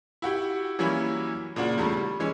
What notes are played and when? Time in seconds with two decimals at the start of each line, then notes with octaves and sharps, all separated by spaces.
0.22 E4 F#4 G4
0.79 E3 F#3 G3 A#3 C#4 E4
1.56 A#2 C#3 D4 F#4
1.78 E2 C#3 G3 A3
1.97 G3
2.20 E3 G#3 C#4